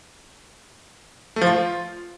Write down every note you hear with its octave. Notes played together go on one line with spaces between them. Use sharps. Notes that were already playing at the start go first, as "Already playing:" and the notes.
A3
F3
F4